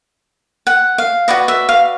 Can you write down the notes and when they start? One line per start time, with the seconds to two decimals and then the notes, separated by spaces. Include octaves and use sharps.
0.67 F#5
0.98 F5
1.28 F#4 B4 D5 D#5
1.48 E5
1.69 F5